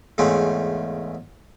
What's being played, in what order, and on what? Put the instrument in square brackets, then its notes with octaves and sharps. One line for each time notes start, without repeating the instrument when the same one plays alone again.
[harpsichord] E2 G#2 C#3 A3 C4